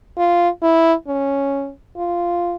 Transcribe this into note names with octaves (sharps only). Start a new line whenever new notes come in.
F4
E4
C#4
F4